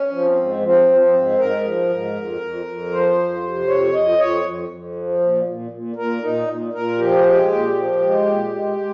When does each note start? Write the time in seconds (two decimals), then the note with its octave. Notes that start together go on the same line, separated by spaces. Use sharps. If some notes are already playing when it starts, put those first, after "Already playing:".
Already playing: C#4
0.11 F3
0.25 C4
0.37 G#2
0.62 F3 C4
0.88 F3
1.01 C4
1.14 G#2
1.38 G#2 A#4
1.65 F3
1.90 G#2
2.15 F2
2.41 F2
2.65 F2
2.91 F3 C5
3.17 F2
3.42 C3
3.67 F2 C#5
3.93 F2 D#5
4.18 F2 C#5
4.43 F2
4.69 F2
4.95 F3
5.20 A#2
5.46 A#2
5.71 A#2
5.96 A#2 A#4
6.22 A#2 D#4
6.47 A#2
6.73 A#2 A#4
6.98 F3 G4
7.19 G#4
7.23 G#3 G4
7.49 A#2 G4
7.75 F3
8.00 G#3
8.25 A#2
8.52 G#3
8.76 G#3